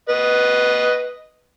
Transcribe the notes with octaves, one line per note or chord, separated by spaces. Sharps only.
B4 D#5